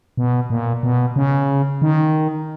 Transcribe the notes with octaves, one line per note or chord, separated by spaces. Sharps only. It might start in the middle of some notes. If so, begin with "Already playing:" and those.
B2
A#2
B2
C#3
D#3